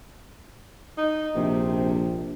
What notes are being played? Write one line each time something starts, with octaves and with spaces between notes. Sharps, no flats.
D#4
A#1 C3